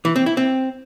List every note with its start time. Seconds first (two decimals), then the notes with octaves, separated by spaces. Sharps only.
0.05 E3
0.16 C4
0.26 E4
0.37 C4